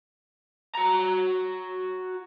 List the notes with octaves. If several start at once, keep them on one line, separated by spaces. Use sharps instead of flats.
F#4 A#5